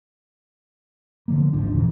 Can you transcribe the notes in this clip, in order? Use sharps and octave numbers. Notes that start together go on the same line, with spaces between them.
D3 F3 A#3
D1 G#1 F3 D4
E2 A#2 C#3 E3